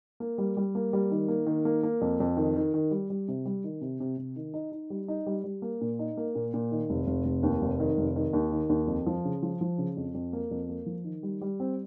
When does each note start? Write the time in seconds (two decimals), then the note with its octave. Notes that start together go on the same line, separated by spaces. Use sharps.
0.20 A#3
0.38 G3
0.57 G3
0.75 A#3
0.93 G3
1.11 D#3
1.28 A#3
1.46 D#3
1.65 A#3
1.83 A#3
2.01 F2
2.20 F2
2.37 D#3
2.56 D#3
2.74 D#3
2.91 G3
3.10 G3
3.28 C3
3.45 G3
3.64 D#3
3.81 C3
4.00 C3
4.18 C3
4.36 D#3
4.54 D#4
4.72 D#4
4.90 G3
5.08 D#4
5.26 G3
5.44 G3
5.62 A#3
5.81 A#2
5.99 D#4
6.17 A#3
6.35 A#2
6.54 A#2
6.71 D#3
6.90 F1
7.07 F1
7.25 F1
7.43 D#2
7.62 F1
7.80 D#3
7.97 F1
8.16 D#3
8.33 D#2
8.52 D#3
8.69 D#2
8.87 F2
9.06 F3
9.25 C#3
9.43 F3
9.61 F3
9.78 C#3
9.97 F2
10.14 F2
10.33 A#3
10.51 F2
10.69 A#3
10.86 F3
11.04 D#3
11.23 G3
11.41 G3
11.60 C4